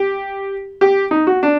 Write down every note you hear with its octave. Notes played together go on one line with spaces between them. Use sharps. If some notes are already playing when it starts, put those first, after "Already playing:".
Already playing: G4
G4
D#4
F#4
D4